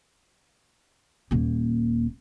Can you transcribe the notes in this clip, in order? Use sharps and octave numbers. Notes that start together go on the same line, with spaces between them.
D#1 A#3